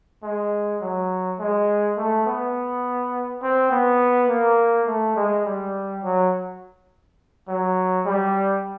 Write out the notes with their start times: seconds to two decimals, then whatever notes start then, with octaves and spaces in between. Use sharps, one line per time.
0.23 G#3
0.81 F#3
1.39 G#3
1.97 A3
2.26 B3
3.42 C4
3.71 B3
4.29 A#3
4.87 A3
5.16 G#3
5.45 G3
6.03 F#3
7.48 F#3
8.06 G3